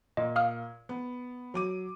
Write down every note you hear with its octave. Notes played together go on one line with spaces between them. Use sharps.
A#2 D#5
F5 D#6 F6
B3
F#3 D6 D#7